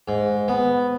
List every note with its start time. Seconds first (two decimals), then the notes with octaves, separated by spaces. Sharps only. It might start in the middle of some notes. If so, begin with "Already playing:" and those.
0.08 G#2
0.48 B3